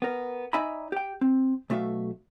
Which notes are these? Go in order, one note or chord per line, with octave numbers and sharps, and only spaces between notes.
B3 A#4
D#4 D5 E5 G#5 A#5 B5
G4 G5
C4
B1 A3 F#4 E5 F5